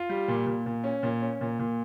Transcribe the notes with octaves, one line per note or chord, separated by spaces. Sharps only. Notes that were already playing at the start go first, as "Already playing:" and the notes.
Already playing: F4
G3
A#2
A#2
A#2
C#4
A#2
C#4
A#2
A#2